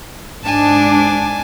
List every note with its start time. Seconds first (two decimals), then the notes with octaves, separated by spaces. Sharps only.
0.44 G#2 D4 G#5 A5